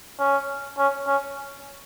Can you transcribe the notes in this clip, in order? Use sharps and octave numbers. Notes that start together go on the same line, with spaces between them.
C#4
C#4
C#4